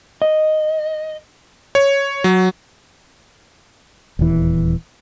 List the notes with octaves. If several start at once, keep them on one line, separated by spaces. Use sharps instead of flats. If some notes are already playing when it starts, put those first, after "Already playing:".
D#5
C#5
F#3
D#1 E2 E3